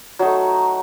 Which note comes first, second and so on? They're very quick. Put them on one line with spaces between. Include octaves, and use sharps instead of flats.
F#3 D#4 A3